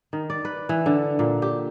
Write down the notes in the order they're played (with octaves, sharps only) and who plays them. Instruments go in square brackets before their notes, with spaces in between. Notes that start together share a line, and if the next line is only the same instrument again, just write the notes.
[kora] D#3
D5
B4
E3
D3
A#2
G4